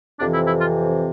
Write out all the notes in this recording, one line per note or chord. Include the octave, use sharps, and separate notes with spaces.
F2 C3 E3 D4
E4
E4
F4